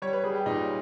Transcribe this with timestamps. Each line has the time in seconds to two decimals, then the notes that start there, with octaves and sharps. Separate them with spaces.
0.02 G3 C#5
0.13 B4
0.24 G3 G#4
0.35 G4
0.46 A#2 D#4